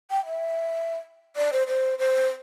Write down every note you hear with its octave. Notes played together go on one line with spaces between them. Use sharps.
G5
E5
D5
C5
C5
C5